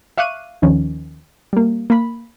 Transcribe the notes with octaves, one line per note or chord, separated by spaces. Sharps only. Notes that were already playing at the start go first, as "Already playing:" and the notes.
E5 F5 C#6 D6 F#6 D#7
D#2 D#3 F3 C#4
G3 A#3
A#3 B5